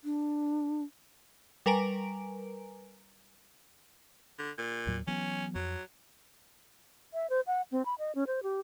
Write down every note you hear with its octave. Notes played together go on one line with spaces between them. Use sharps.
D4
G3 A#4 B4 G#5 A#5 D7
D3
A#2
D#2 A2 F#3
E3 F#3 B3 C#4
F2 F#3
E5
C5
F#5
C4
B5
D#5
C#4
C5
G4